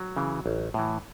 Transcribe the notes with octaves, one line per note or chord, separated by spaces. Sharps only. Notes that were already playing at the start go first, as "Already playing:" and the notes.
Already playing: F#3
C#3 E3
A1
A2 E3